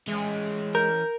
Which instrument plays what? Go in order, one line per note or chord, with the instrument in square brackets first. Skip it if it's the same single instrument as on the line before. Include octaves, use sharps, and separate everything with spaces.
[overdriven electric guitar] E3 C#4 [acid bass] G#3
[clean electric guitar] A#4 [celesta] G6